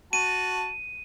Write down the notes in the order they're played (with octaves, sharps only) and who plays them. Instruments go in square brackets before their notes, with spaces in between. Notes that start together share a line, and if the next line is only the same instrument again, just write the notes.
[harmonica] F#4 A5 [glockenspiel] D#7